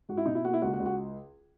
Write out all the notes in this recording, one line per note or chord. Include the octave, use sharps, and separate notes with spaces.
G#2 F#4
E4
B2 D#4
E4
A#3 F#4
E4
C#2 F#4
F#4
C#2
F#4